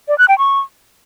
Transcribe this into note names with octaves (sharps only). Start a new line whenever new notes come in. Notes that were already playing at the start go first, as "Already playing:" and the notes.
D5
F#6
G5
C#6